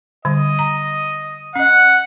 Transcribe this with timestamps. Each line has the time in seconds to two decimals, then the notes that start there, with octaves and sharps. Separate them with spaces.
0.25 D3 G3 D#5
0.59 A#5
1.56 C#4 D#5 F#5